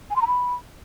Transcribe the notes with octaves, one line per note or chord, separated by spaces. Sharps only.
G#5
C6
A#5
B5